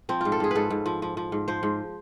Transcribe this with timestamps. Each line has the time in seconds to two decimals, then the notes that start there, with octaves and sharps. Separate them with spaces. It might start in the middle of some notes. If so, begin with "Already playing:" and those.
0.09 F3 C4
0.21 G#2 F4
0.32 A4
0.40 G#2 G#4
0.51 G#2 A4 B4
0.70 G#2
0.86 F3
1.02 F3
1.17 F3
1.32 G#2
1.48 F3 C5
1.63 G#2